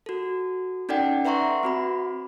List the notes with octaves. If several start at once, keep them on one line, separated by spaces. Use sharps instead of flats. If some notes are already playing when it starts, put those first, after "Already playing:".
F#4 A4
C#4 D#4 A4 D5 F#5 G5
B4 E5 F#5 A#5 C6 C#6
C4 F#4 B5